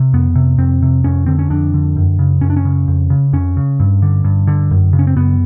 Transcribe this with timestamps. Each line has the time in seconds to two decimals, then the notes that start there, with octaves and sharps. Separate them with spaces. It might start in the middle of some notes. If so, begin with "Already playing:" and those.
Already playing: C3
0.13 F2 B3
0.35 C3
0.58 F2 C4
0.82 C3
1.04 F2 C#4
1.26 D3 C4
1.39 C#4
1.50 F2 D4
1.74 D3
1.96 F#2
2.19 C#3
2.41 F#2 C#4
2.50 D4
2.57 C#4
2.65 C#3
2.88 F2
3.10 C#3
3.33 F2 C#4
3.57 C#3
3.80 G2
4.02 D3
4.24 G2
4.47 D3
4.71 F#2
4.93 C#3
4.99 C#4
5.07 C4
5.16 F#2 B3